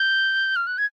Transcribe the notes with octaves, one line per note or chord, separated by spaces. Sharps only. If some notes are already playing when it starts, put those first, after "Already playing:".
Already playing: G6
F6
F#6
G#6